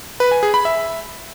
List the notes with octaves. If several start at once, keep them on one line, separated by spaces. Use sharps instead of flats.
B4
G#5
G#4
B5
E5